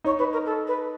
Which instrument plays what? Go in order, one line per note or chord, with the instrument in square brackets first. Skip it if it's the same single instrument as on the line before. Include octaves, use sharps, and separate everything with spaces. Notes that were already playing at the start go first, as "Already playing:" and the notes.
[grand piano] D#4 [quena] C#5
[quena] B4
A#4
A4
B4